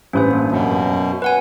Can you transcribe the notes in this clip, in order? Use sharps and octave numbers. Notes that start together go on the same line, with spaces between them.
A1 G2 C#4 B4 C5
A#3 D4
F#2 B2
B4 F#5 G#5